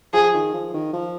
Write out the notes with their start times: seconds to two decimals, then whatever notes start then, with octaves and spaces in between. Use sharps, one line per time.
0.13 F3 G#4
0.34 D#3
0.54 F3
0.74 D#3
0.93 F3